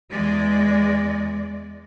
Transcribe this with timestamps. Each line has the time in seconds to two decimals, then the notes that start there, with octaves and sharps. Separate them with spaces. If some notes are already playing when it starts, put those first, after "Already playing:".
0.11 E2 G#3 D5